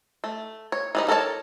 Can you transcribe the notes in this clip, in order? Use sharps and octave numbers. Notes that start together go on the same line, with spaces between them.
A3
C#5
E3 G3 D#4
A4 A#4 C#5 D5 A5